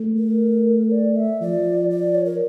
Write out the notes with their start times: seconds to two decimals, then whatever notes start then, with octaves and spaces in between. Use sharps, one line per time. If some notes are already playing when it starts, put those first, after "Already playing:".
Already playing: A3
0.17 A#4
0.91 D5
1.16 E5
1.41 F3 D5
1.90 D5
2.15 C#5
2.25 A#4